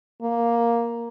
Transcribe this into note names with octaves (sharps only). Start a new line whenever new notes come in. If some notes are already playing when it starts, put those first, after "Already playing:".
A#3